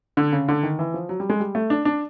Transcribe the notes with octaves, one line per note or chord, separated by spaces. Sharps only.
D3
C#3
D3
D#3
E3
F3
F#3
G3
G#3
G3
A3
D4
D4